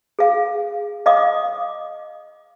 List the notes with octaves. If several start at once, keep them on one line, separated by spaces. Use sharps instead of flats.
G#4 F5
D#5 F5 D6 D#6